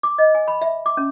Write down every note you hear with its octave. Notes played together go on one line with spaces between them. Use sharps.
D6
D#5
G#5
B5
E5
D6
C#4